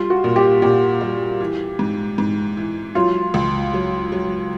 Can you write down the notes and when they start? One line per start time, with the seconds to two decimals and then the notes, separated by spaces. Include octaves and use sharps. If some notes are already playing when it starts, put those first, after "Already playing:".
Already playing: G3 F4
0.10 F#4
0.24 A#2
0.36 G4
0.62 A#2 G4
1.01 G3
1.41 E3
1.79 G#2
2.18 G#2
2.57 E3
2.95 F#3 F4
3.34 C#2
3.74 F#3
4.12 F#3